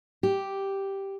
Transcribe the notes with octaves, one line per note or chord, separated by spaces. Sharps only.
G4